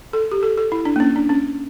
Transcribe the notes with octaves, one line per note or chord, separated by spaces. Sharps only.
A4
G4
A4
A4
E4
D4
A#3
C#4
D4
C#4